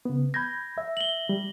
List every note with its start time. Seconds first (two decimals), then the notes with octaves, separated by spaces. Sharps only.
0.05 C#3 B3
0.34 B5 G6 G#6 A#6
0.78 E5
0.97 F#7 G7
1.29 G3